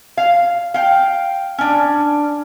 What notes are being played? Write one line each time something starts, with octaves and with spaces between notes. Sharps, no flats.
F5
F5 G5
C#4 D4